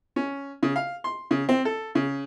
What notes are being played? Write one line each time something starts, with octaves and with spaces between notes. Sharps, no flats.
C#4
C#3
F5
C6
C#3
C4
A4
C#3